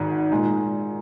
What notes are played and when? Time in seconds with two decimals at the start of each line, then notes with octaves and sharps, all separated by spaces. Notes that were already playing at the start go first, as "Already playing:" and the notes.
Already playing: G#1 G#2 D#3
0.31 A#2 G#3 D#4